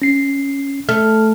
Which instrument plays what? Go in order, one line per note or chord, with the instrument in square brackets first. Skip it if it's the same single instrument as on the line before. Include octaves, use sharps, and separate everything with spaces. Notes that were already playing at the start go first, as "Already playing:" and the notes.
[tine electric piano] C#4 C7
[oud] A3 [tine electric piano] F6